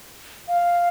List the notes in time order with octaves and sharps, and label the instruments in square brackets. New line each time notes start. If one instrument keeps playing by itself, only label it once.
[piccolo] F5